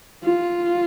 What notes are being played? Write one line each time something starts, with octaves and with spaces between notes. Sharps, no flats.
F4